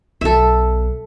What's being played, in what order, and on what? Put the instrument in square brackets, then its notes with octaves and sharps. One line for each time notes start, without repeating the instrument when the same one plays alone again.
[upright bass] B1 B3 [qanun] A4 E5